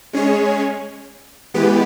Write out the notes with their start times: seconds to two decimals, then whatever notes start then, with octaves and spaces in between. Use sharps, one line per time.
0.13 G#3 C#4 G#4 C#5
1.54 E3 G#3 B3 G4 B4